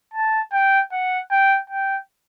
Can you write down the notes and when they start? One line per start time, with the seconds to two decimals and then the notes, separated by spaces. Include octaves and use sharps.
0.14 A5
0.53 G5
0.92 F#5
1.31 G5
1.70 G5